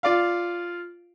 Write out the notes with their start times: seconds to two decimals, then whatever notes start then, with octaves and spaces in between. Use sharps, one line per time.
0.03 F4 D5 F5